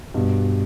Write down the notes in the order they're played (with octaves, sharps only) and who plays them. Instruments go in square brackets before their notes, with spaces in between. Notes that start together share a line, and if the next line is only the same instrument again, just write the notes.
[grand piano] G2 B2